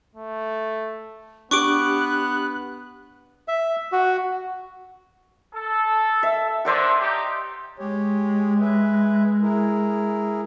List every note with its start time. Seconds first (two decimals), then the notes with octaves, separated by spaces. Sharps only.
0.15 A3
1.51 B3 D4 G4 C#6 D6 F#6 D7
3.48 E5
3.92 F#4
5.54 A4
6.23 E5
6.65 C2 F#2 D3 C5 D5 F#5
7.00 C4 D#4 G4
7.79 G#3 G4 C#5
8.61 B4 E5
9.42 E4 G#4 A#4